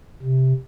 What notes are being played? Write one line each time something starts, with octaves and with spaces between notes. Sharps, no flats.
C3